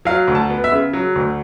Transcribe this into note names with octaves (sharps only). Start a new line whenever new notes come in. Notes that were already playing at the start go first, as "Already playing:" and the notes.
F#3 F5
D2
A5
B3
E5
C#3
F#3
D2